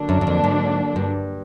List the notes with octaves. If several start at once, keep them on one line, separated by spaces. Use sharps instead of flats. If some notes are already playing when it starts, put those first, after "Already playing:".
Already playing: D3 F#3 A#3 D4
F#2
F#2
F2
G#2
G2